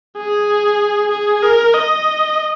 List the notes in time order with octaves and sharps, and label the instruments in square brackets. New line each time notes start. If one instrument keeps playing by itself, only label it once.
[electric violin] G#4
G#4
A#4
D#5